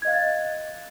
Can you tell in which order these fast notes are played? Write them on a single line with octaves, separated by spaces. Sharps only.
G#6 D#5 F5 F#6 A6